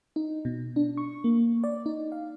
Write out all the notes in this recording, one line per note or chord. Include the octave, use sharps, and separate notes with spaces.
D#4
B2
D4
C#6
A#3
D5
D#4
F5